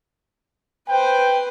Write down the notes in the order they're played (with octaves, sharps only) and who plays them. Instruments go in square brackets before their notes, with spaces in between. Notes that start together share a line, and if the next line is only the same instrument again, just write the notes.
[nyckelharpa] B4 C5 [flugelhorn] G5